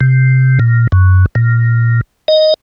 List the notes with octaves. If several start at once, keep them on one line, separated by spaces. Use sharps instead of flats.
C3
A#2
F#2
A#2
D#5